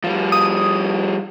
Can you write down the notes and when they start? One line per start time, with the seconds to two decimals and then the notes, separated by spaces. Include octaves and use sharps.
0.04 F3 G3
0.32 D#6